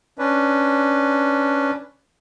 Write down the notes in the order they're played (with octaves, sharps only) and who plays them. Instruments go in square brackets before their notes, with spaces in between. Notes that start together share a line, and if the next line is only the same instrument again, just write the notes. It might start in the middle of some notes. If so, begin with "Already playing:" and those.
[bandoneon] C#4 D4 B4